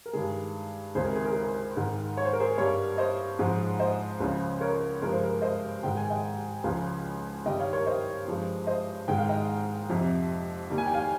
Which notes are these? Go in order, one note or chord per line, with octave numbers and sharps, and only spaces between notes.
A#4
G2 D#3 G#3 G#4
C#2 C3 D#3 G#3 G#4 C5
A#4
G#4
A#4
G#4
A#4
G#2 D#3 G#3
C#5
C5
A#4
G#4 C5
G2 G3 A#4 C#5
C5 D#5
G#2 F3 G#3
C5 D#5
C#2 C#3 F3
A#4 C#5
G2 F3 G#3 A#4
C5
A#4
C5 D#5
G#2 D#3 G#3 G5
G#5
D#5 G5
C#2 C#3 F3 G#3 F5 G#5
G2 D#3 G3 D#5 G5
C#5 F5
A#4 C#5
C5 D#5
G2 F3 G#3
C5 D#5
G#2 D#3 G#3 G5
F5
D#5 G5
F2 C3 F3
D#2 D#3 G3
G#5
G5
F5 G#5